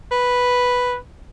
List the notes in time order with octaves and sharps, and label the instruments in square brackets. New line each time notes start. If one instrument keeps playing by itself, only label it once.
[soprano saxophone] B4